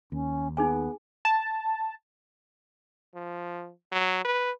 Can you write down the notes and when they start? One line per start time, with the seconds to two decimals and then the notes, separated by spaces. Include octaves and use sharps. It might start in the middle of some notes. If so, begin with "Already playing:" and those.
0.12 D#2 C#4
0.57 B3 D#4 G#4 G#5
1.25 A5
3.15 F3
3.92 F#3
4.25 B4